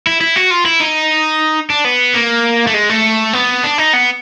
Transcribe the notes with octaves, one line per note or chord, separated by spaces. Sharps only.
E4
E4
F#4
F4
E4
D#4
D4
B3
A#3
A3
G#3
A3
B3
D4
D#4
B3